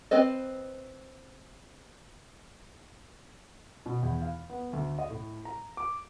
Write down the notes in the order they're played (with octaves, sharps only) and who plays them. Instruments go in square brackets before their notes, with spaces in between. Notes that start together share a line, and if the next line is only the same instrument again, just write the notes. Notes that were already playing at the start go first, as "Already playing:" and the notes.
[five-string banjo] C4 B4 C5 D#5
[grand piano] B2
E2
F5
B3
D2
D#5
A2
A#5
D6